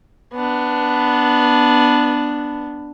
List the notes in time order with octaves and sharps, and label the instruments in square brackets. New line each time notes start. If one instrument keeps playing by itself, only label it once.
[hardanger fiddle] B3 D4